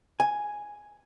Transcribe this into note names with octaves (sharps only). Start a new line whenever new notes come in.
G#5